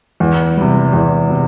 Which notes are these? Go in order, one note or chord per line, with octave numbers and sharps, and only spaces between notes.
E2
C3 G3
E2
C3